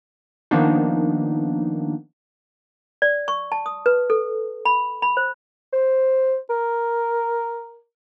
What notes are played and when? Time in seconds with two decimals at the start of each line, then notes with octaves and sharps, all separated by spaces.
0.51 D#3 F3 A#3 B3 D4 D#4
3.02 D5
3.28 C#6
3.52 A5
3.66 D#6
3.86 B4
4.10 A4
4.65 B5
5.02 B5
5.17 C5
5.73 C5
6.50 A#4